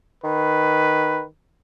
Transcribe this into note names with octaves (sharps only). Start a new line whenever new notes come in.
D#3 B4